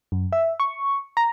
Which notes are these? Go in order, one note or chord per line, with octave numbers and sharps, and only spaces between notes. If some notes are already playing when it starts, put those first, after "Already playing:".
F#2
E5
C#6
A#5